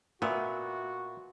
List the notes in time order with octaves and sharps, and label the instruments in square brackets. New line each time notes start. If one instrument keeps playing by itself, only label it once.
[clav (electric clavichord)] A#2 B3 [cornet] F#4 [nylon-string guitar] E5